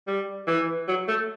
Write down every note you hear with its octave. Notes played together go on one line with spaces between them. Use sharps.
G3
E3
F#3
A3